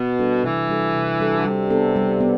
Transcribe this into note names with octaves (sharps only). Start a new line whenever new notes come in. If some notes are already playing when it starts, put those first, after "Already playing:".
Already playing: B2
G3 D4 F#4 A4
C3 E3
G3 D4 F#4 A4
C3
G3 D4 F#4 A4
D3
C3 G3
B3 D4 A4
G3
B3